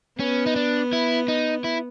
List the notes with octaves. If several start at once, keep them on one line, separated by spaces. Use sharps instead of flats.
B3 C#4
D#4
D4
E4
D#4
E4